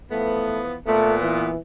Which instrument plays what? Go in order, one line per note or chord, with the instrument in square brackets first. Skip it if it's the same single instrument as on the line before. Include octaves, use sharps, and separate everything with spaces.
[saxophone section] E3 F3 B3 [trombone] A3
[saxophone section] A#2 B3 [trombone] A3
[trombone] E3